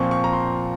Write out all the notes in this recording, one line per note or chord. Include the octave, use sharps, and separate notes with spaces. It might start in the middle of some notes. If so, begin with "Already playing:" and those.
Already playing: A#2 F3 C4 C#6
C#6
A#5
C6